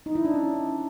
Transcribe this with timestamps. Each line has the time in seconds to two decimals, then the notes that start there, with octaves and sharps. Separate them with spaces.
0.06 D#4
0.15 E4
0.25 D4
0.34 C#4